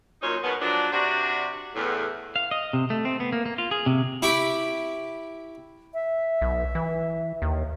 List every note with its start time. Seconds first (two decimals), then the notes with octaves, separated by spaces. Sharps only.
0.22 F#2 A#2 C#4 D#4 C5 C#5
0.44 B2 D#3 G#3 B3
0.61 F3 F#3 G#3 D4
0.92 C3 D4 F#4
1.75 E2 A2
2.36 F5
2.51 D#5
2.73 C3
2.90 A3
3.05 C4
3.20 B3
3.32 A#3
3.46 A#3
3.58 F4
3.71 G#4
3.86 C3
4.22 E4 G4 B5 C#6 D6
5.94 E5
6.42 B1
6.75 E3
7.42 D#2